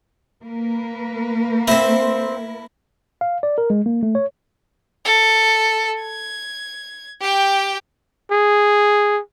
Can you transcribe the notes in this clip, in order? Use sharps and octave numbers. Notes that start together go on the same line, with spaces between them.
A#3 A#4 B4
C4 E4 C5 E5 A#5
F5
D5
A#4
G#3
A#3
A3
C#5
A4
G#6
G4 G5
G#4